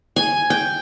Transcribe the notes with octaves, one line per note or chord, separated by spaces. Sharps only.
G#5
G5